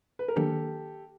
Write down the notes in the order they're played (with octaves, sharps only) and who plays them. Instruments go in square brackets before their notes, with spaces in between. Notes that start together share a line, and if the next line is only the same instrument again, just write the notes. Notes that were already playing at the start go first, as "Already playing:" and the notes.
[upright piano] B4
A#4
[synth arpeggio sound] D#3 F#3 A#3 D4 [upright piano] G4 A4